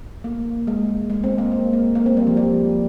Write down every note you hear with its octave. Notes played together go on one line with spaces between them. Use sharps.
A#3
G#3
G#3
C4
A#3
A#3
A#3
A#3
C4
G3
F3
G3